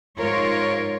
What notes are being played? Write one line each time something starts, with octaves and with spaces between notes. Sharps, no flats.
G#2 F4 A#4 C#5